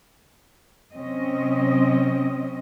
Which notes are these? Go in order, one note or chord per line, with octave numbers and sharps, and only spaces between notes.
C3 F#3 C4 C#4 D#5